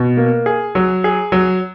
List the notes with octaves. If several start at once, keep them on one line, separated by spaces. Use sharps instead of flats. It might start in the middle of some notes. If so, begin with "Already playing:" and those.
Already playing: B2
A#3
G#4
F#3
G#4
F#3